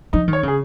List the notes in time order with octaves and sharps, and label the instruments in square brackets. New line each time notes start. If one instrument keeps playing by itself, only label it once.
[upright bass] F3 [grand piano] D#4
[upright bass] D#3
[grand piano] C#5
[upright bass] C#3 [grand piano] G#4